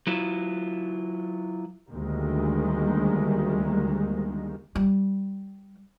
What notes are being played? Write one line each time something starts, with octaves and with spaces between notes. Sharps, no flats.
F#3 E4 F4
D2 D#3 G3 G#3 A#3
G3